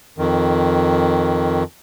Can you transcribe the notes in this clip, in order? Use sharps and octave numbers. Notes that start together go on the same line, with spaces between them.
F2 D#3